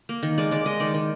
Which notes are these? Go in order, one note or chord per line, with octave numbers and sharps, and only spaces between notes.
A#3
D#3
G#3 D5
G#3 D5
G#3 D#5
D#3 D5
D#3